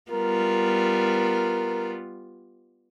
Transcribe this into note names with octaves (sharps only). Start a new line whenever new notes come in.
G3 B3 F4 A#4